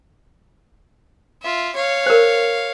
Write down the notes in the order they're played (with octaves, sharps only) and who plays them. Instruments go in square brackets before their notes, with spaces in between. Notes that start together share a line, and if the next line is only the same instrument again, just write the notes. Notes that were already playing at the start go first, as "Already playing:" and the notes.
[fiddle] F4 E5
C#5 F5
[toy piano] A#4 C5